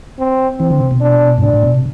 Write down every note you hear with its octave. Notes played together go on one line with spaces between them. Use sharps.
C4
E3 C4
D3
C3
B2
D4
G2
A2 D4
A2
B2
C3